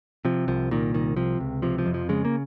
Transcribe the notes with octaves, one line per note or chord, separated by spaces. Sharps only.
C3 F3
C2 F3
A#2 D#3
C2 D#3
C3 F3
C#2
C3 F3
F3
F2
F3
C#3 G#3
A#3